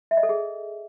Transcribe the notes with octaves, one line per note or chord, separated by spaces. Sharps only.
E5
D#5
A4
G#4